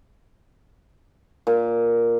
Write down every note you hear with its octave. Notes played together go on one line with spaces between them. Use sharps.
A#2